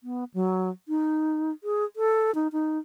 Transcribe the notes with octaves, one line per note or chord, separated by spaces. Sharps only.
B3
F#3
D#4
G#4
A4
D#4
D#4